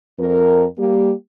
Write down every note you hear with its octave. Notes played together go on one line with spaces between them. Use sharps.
F2 A#4
G3 A#3 G4